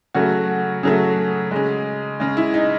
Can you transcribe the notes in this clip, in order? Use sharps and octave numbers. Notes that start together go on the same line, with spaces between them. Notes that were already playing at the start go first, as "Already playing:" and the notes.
C#3 F#3 A3 F#4
C#3 F#3 A3 G#4
C#3 G#3
C#3 G#3
E4
D#4